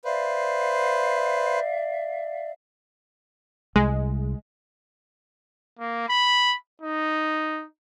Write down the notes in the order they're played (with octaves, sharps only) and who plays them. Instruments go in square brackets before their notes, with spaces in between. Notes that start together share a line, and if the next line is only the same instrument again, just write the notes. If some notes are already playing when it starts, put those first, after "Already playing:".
[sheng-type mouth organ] B4 C5 [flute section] D5 E5 F5
[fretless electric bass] C2 [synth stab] G#3
[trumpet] A#3
B5
D#4